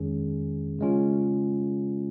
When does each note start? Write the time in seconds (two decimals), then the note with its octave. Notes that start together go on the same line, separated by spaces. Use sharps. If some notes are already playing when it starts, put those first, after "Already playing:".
Already playing: F2 D#3 G#3 C#4 G#4
0.79 C#3 G#3 C#4 F4